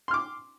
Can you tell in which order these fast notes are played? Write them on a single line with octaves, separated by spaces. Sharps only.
C6 F6 D6